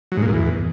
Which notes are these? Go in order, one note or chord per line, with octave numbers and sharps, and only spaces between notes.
F#3
G#2
A#2
G#2
E2